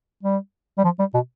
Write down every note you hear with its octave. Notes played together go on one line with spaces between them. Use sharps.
G3
G3
F3
G3
B2